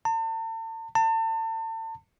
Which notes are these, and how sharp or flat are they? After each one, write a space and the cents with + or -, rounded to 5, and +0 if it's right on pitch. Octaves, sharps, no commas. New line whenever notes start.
A5 +40
A5 +35